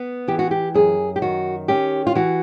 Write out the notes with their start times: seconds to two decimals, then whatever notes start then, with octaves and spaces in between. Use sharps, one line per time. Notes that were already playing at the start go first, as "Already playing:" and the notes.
Already playing: B3
0.28 E3 G4
0.39 F#4
0.51 G4
0.74 F#2 G#4
1.16 G4
1.22 D#3 F#4
1.68 C#4 G4
2.07 F4
2.15 E3 F#4